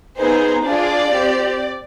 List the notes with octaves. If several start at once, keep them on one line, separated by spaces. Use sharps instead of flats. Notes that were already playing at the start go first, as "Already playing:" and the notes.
B3 D#4 G#4 C5
D4 F4 G#4 D5
C4 G4